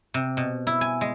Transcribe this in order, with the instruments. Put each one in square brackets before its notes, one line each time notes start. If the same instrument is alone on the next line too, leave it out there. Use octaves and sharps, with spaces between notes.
[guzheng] C3
B2
E4
G#5
G#3